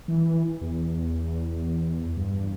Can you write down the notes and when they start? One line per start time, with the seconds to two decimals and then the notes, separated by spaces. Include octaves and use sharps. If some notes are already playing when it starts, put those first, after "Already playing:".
0.08 E3
0.62 E2
2.17 G2